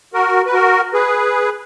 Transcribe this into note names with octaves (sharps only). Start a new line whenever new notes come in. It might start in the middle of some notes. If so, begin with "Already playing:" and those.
F#4 A#4
B4
F#4 A#4
G#4 B4